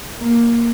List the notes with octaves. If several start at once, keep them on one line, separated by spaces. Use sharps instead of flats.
A#3